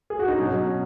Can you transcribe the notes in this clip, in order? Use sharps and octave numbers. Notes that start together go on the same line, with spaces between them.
G#4
F#4
D#4
B2 F#3 C#4